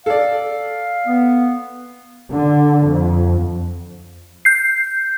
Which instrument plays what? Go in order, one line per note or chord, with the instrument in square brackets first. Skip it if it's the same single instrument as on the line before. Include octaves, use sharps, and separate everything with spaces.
[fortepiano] A4 D5 [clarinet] F5
[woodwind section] B3
[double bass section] D3
F2
[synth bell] G6 C7